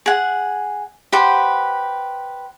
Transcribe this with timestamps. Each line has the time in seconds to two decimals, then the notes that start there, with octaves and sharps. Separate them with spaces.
0.06 G#4 F#5
1.12 G4 B4 C5 F#5